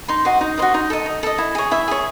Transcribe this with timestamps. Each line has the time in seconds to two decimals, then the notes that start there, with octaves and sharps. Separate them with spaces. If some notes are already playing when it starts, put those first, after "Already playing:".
0.08 D#4 C6
0.25 F#4 C5 D#5
0.41 D#4
0.58 F#4 C5 D#5
0.74 D#4
0.90 A4 D#5
1.06 D#4
1.23 A4 D#5
1.38 E4
1.55 G#4 C#5
1.71 E4 E5
1.88 G#4 C#5